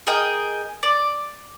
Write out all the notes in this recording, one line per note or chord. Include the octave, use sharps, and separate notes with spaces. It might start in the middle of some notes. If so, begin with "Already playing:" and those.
G#4 A#4 D#5 G5
D5